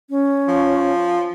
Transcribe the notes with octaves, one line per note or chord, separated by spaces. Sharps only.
C#4
F3